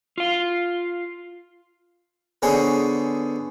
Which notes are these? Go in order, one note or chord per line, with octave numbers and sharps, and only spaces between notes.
F4 F5
D3 B3 C#4 G#4 C5